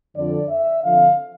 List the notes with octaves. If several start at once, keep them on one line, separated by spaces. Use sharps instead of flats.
F2 D3 F3 D5
E5
D3 F3 C4 F5